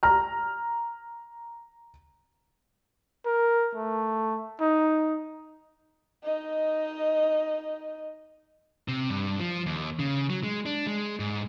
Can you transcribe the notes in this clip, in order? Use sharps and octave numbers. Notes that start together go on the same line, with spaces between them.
A#5 F6
A#4
A3
D#4
D#4 D#5
C3
G2
F3
D#2
C#3
F#3
G#3
D4
G#3
G#2